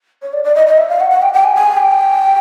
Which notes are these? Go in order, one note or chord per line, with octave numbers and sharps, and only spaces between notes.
C#5
D5
D5
D#5
D#5
E5
F5
F#5
F#5
G5
G5
G#5
G#5
G5